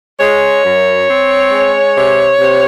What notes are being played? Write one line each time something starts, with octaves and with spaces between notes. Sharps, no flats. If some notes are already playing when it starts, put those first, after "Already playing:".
G#3 C#5
F#2
C4
G#3
C3
C3